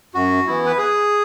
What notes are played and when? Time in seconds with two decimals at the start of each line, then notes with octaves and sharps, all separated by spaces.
0.14 F#2 F#4
0.47 E3 B3 E4
0.66 B4
0.78 G#4